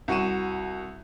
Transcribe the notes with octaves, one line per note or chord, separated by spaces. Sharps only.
C2 F#4 C#6 D#7 E7